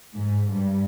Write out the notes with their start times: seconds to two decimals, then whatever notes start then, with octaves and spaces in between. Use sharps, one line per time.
0.15 G#2
0.51 G2